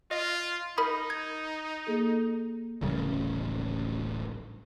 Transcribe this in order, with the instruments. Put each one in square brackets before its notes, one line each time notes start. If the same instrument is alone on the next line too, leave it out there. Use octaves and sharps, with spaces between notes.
[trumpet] F4 [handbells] D#5
[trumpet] D#4 [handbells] A#4 B5 D#6
[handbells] G#6
[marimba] A#3 G#4 A4
[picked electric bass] D1 A1 C#3 G3